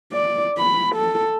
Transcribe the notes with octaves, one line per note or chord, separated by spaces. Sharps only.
D5
B5
A4